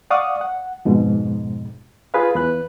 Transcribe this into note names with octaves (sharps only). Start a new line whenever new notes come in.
D5 F5 F#5 C#6 D#6
F#5
F2 G#2 B2
F4 G#4 B4 F5
E2 B4 F#6